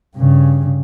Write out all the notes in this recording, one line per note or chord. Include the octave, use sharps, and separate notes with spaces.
G2 C#3